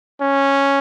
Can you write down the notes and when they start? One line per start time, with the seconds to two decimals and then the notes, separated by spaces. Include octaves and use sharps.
0.22 C#4